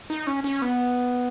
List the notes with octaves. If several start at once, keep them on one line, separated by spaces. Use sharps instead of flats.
D#4
C#4
C#4
B3